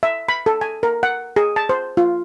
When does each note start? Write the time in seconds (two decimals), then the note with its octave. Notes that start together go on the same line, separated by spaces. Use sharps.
0.03 E5
0.29 B5
0.46 A4
0.61 G#5
0.83 A#4
1.03 F#5
1.36 G#4
1.56 A5
1.69 C5
1.97 F4